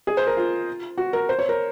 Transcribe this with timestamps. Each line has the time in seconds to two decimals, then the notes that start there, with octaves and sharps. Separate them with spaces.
0.07 G#4
0.17 C5
0.27 A#4
0.37 F4
0.98 F#4
1.13 A#4
1.29 C5
1.39 C#5
1.49 A#4